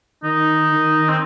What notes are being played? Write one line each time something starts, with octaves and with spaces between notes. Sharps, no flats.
D#3 D#4
D#3
C4